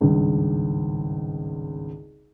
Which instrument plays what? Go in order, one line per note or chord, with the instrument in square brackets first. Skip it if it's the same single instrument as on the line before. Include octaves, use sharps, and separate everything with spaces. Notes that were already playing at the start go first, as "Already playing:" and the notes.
[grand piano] G#1 C#2 G2